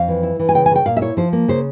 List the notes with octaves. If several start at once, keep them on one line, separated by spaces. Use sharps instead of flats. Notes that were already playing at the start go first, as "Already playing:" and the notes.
Already playing: F2 F5
E3
E4
E3
G#5
C#3 G5
G#5
C#3 G5
A#2 F5
E5
E4 C#5
F3 C5
A#3
C#3 C5